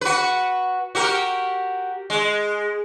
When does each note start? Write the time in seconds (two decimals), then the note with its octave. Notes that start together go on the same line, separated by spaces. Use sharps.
0.01 F#4 B4
0.95 F#4 G4 A#4
2.10 G#3